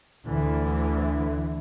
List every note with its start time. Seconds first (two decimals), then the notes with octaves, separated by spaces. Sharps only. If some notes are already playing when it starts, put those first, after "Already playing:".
0.24 D2 D3 E3